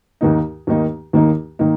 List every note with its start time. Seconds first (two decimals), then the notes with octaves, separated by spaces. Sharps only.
0.21 D#2 D#3 A#3 D#4
0.67 D#2 D#3 A#3 D#4
1.13 D#2 D#3 A#3 D#4
1.59 D#3 A#3 D#4